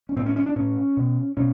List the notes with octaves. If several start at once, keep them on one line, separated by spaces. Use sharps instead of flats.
C#4
A2 C4
C#4
C#4
D4
A2 C#4
B2
B2 C#4